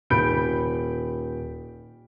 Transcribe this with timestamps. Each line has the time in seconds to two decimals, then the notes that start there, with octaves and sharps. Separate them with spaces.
0.10 D#1 B5 G6 D7